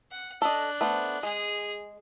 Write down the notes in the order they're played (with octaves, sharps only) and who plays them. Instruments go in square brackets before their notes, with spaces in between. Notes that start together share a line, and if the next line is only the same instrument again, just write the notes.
[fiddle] F#5
[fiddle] D4 F#6 [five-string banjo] A4 D#5
[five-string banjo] A3 B3 C5
[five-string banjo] G#3 [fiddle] G#4